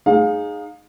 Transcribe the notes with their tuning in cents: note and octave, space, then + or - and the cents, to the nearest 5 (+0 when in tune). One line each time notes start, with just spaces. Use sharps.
D#4 -15 G#4 +0 F5 +25